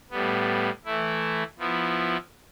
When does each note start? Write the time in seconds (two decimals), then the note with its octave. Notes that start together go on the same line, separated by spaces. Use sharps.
0.11 A2 G3 B3
0.85 E3 A3 E4
1.58 F3 B3 E4